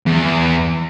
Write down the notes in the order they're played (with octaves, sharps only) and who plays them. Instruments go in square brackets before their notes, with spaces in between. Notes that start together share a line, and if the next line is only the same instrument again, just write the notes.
[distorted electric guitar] E2